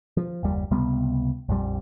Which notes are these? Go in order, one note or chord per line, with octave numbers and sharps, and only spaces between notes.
F3
F#1 D#2 G3
C#2 C3 G3 B3
A#1 F2 G3